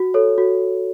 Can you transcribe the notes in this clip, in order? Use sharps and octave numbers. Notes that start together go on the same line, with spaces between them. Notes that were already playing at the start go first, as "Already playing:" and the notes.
Already playing: F#4
A4 C#5
F#4